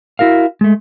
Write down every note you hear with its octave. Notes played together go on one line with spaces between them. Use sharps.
E4 F#4 A#4 F5
G#3 A3